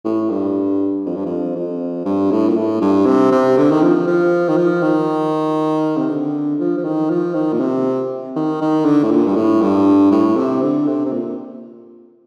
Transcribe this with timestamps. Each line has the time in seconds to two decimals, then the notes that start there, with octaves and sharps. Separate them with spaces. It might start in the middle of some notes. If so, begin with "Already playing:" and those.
0.05 A2
0.30 G2
1.06 F2
1.16 G2
1.26 F2
1.56 F2
2.05 G2
2.31 A2
2.49 A#2
2.57 A2
2.81 G2
3.06 C3
3.32 C3
3.58 D3
3.71 D#3
3.83 F3
4.07 F3
4.49 D#3
4.57 F3
4.83 D#3
5.97 C3
6.09 D3
6.60 F3
6.78 F3
6.84 D#3
7.10 F3
7.35 D#3
7.53 A#2
7.60 C3
8.36 D#3
8.61 D#3
8.85 D3
9.03 A2
9.11 A#2
9.27 G2
9.36 A2
9.62 G2
10.12 A2
10.37 C3
10.62 D3
10.87 C3
11.06 C3
11.13 A#2